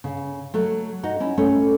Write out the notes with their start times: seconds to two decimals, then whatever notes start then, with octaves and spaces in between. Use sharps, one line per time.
0.04 C#3
0.54 F#3 A3
1.03 D#4 F#4
1.20 C#4 E4
1.38 A3 C#4